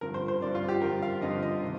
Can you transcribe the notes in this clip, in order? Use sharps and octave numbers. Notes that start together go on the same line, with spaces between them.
G2 D3 F3 A#4
C5
C5
G2 D3 F3 D5
F4
G4
G2 D3 F3 A#4
F5
G2 D3 F3 D#5
D#5
C3 D#3